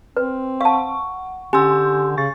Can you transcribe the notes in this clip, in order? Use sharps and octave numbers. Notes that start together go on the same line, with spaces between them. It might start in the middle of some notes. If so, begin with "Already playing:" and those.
C4 B4
F5 F#5 A5 C#6
D3 C#4 G4 G#5 C6 E6 G6
C#3 C#6 A6